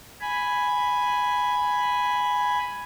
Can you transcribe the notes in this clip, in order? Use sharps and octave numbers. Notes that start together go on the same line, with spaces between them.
G#5 B5